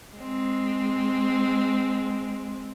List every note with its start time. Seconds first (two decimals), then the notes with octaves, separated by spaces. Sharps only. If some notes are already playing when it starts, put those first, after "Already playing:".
0.16 G#3 C4